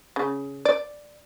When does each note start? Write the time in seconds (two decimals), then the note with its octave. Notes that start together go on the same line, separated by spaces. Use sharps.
0.16 C#3
0.65 D5